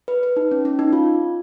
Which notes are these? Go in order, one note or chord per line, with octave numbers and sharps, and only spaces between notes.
B4
B4
D#4
C#4
C#4
D#4
F4